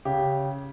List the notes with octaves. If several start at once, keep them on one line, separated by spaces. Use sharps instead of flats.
C#3 G4